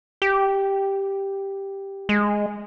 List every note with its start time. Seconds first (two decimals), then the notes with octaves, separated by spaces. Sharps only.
0.22 G4
2.09 G#3